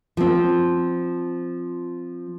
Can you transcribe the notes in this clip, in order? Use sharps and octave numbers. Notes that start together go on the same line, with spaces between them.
F3 C4